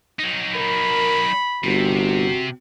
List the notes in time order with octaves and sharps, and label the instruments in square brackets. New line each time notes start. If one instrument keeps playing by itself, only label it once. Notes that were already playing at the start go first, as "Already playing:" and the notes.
[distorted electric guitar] F#3 D#4
[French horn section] A#4 [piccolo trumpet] B5
[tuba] G1 [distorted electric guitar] C3 [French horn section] F#4